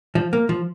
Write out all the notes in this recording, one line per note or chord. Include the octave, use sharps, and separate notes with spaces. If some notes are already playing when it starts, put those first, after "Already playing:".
F3
A#3
F3